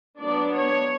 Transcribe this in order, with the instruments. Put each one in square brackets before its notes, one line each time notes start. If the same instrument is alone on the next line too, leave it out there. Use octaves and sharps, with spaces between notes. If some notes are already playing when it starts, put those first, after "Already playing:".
[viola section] F#3 B3 D4 D5
C#5